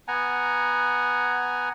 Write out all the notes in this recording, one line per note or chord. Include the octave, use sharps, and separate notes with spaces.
B3 F#5 G#5 A#5